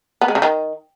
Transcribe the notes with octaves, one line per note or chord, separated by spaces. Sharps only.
B3
G#3
C#3
D#3